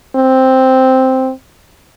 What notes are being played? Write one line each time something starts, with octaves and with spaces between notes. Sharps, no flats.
C4